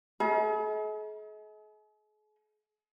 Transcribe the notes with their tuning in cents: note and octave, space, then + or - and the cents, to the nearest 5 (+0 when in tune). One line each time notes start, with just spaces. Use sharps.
G#4 +45 D#5 +40 B5 -45